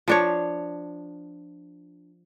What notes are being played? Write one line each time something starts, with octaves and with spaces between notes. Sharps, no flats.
F3 D4 C#5